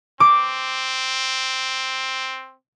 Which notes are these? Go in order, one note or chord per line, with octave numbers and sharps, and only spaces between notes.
C4 D6